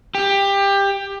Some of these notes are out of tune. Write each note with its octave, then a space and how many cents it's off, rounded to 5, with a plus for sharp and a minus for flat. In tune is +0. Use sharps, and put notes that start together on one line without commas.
G4 +20